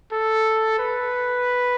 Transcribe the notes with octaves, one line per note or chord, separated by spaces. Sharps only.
A4
B4